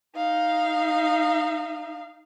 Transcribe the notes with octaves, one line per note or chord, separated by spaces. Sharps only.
D#4 F5